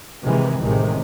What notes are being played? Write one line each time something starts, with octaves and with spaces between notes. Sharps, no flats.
C3 D#3 E3 G#3
A1 A2 C3 D#3 G#3